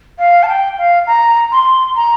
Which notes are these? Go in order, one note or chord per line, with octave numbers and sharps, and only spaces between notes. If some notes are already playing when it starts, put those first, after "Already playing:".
F5
A5
G5
F5
A#5
C6
A#5